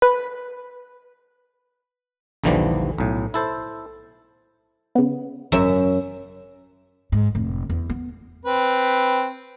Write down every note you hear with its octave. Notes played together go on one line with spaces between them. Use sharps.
B4
A#1 D#2 D3 E3 F3 G3
B1 A2
E4 A4 C5
C#3 B3
G#1 F#2 C#3 E5 E7
G#2
F1 A2
E2
B3
C4 B4